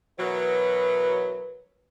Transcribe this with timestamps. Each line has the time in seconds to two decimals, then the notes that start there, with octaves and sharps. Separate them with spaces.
0.19 B2 E3 F#3 A#4 B4